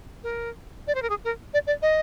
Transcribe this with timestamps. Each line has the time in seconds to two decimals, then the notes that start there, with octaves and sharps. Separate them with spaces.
0.23 A#4
0.87 D5
0.95 C5
1.02 A#4
1.10 G#4
1.25 A#4
1.54 D5
1.67 D5
1.82 D#5